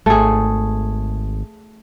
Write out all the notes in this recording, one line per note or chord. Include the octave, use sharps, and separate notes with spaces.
G#1 A3 G#4